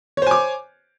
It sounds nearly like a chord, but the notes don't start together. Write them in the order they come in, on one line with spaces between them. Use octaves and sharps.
C#5 C5 G#5 D6